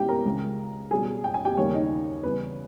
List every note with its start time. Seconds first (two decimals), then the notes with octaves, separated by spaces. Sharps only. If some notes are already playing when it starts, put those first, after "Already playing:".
Already playing: B2 G#3 C#4 E4 G4 G5
0.08 A#4 A#5
0.25 C#2 C#3 G#3
0.91 B2 G3 C#4 G#4 G#5
1.24 G5
1.34 G#5
1.45 G4 G5
1.57 D#2 C#3 G3 A#3 C#4 C#5
1.73 D#4 D#5
2.23 E2 C#3 G3 C#4 B4